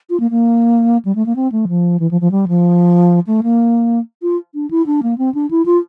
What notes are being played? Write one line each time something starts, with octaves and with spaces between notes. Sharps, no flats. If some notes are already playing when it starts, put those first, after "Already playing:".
F4
A#3
A#3
G3
A3
A#3
C4
A3
F3
E3
F3
F3
G3
F3
A3
A#3
F4
D4
E4
D4
A#3
C4
D4
E4
F4